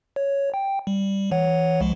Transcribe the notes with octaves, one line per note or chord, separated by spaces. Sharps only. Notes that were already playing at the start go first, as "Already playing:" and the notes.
C#5
G5
G3
E3 C#5 F#5
C2 F3 G#3